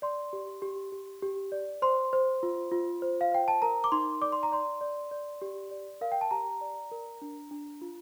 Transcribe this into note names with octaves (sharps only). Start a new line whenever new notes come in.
D5 C6
G4
G4
G4
G4
D5
C5 C6
C5
F4
F4
C5
F5
C5 G5
A5
A#4 A#5
D6
D#4 C6
D5 D6
C6
A#5
D5 C6
D5
D5
G4
D5
A#4 F5
G5
A5
G4 A#5
D5
A#4
D4
D4
F4